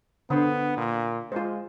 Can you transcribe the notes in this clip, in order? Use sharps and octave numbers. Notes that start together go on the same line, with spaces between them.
D3 B3 C5
A#2
G#3 F4 C5